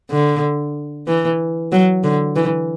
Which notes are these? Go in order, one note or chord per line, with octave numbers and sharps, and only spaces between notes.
D3
E3
F#3
D3
E3